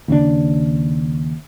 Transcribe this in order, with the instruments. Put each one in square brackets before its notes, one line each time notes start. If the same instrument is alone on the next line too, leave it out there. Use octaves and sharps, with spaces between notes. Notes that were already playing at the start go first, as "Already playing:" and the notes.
[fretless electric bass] D#2 C#3 D4